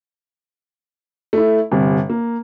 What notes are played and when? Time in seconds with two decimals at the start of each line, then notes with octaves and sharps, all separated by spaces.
1.33 A3 E4
1.72 G1 C3
2.10 A#3